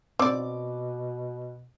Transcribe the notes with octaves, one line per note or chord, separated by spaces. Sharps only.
B2 C4 D5 D6